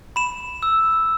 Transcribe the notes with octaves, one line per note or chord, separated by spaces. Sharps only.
B5 E7
E6